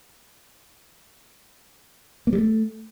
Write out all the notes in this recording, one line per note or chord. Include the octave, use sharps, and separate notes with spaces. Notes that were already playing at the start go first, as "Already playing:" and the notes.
A#3
G3
A3